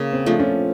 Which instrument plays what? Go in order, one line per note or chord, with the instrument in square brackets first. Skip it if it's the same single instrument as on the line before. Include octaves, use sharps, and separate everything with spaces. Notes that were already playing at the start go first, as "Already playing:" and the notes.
Already playing: [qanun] C#3 [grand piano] A#3
[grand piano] C4
[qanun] F3 A3 D4
[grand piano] C#4